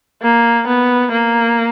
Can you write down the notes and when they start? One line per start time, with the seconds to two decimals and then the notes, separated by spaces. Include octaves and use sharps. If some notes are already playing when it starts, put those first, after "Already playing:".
0.22 A#3
0.67 B3
1.12 A#3